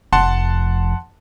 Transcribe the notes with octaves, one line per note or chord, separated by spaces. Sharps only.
F1 F2 F#5 A5 C6